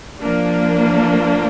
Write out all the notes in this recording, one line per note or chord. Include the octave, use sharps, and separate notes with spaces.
F3 A#3 D4